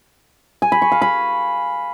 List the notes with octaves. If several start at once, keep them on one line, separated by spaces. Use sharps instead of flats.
G#5
B5
C#6
F5
B5